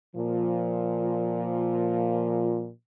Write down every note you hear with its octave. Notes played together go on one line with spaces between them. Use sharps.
A#2 F3